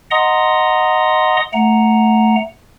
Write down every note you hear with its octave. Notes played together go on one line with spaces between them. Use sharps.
D#5 F#5 A#5 C6 D#6
A3 F#5 A#5